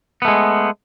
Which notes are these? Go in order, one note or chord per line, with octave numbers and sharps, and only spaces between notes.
G#3 A3 B3